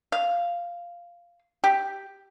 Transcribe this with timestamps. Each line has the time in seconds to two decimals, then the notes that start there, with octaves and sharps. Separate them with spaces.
0.12 F5
1.64 G4